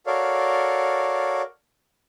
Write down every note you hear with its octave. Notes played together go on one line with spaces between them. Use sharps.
F#4 A4 A#4 C#5 D5 F5